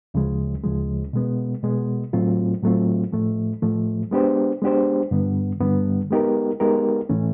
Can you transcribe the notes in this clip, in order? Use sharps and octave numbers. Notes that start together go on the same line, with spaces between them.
D2 C#3 F3 G#3
D2 C#3 F3 G#3
B2 G#3 B3
B2 G#3 B3
A2 F#3 A3 C4 F4
A2 F#3 A3 C4 F4
A2 F3 A3
A2 F3 A3
G#3 B3 D4 G4 C5
G#3 B3 D4 G4 C5
G2 D3 G3 B3
G2 D3 G3 B3
G#3 B3 D#4 G4 A#4
G#3 B3 D#4 G4 A#4
A2 E3 A3 C#4